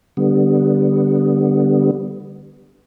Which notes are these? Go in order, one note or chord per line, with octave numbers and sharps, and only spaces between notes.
D3 G3 B3